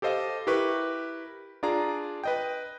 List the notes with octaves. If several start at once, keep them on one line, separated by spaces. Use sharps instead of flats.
G4 A4 C5 D#5 F5
E4 G4 A#4 B4 C#6
D4 F4 G#4 D5 A#5
B4 D#5 G5